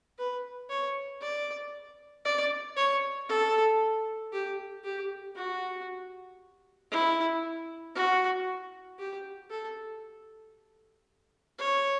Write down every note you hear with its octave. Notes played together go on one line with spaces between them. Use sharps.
B4
C#5
D5
D5
C#5
A4
G4
G4
F#4
E4
F#4
G4
A4
C#5